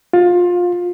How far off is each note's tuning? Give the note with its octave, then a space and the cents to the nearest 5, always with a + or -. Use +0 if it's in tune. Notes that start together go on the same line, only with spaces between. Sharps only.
F4 +20